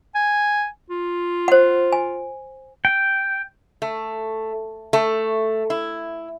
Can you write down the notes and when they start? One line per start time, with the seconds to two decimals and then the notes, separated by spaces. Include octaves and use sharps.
0.15 G#5
0.90 F4
1.48 C5 F#5
1.92 G#5
2.85 G5
3.82 A3
4.93 A3
5.70 E4